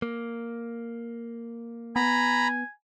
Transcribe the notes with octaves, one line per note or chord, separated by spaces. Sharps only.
A#3
B3 G#5 A#5 B5